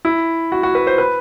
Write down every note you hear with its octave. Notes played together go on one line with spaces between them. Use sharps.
E4
F#4
F#4
B4
C5
B4